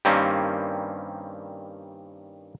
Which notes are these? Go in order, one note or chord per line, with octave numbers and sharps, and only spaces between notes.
G2 D#3 G3 A#3 C4 C#4